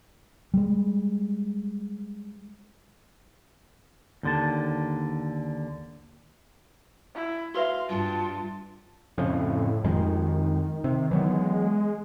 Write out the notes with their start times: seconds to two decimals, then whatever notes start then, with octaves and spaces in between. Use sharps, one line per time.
0.54 G3 G#3
4.23 D#2 D3 A5
7.15 E4
7.54 F#4 B4 E5 F5 C6
7.89 G2 F4 A5
9.18 F2 A2 C#3
9.84 F2 D#3 G#3
10.84 C3
11.11 E3 F#3 B3
11.33 G#3